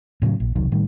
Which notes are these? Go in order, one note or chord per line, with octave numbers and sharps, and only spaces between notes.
A2 C#3 F3 F#3
A#1
E1 C2 D#3 F#3
A2 D#3 G3